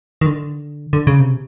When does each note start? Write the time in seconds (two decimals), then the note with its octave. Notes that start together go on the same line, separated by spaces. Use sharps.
0.21 D#3
0.26 D3
0.93 D3
1.07 C#3
1.20 C3